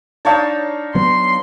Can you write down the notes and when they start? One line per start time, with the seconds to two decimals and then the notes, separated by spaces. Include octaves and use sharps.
0.25 D4 D#4 C#5 F5 A5 A6
0.95 F#3 B3 C6